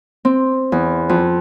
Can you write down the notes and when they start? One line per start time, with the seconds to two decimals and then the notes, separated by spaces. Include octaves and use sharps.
0.25 C4
0.72 E2
1.09 F2